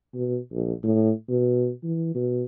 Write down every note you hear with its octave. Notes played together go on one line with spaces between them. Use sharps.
B2
A#1
A2
B2
E3
B2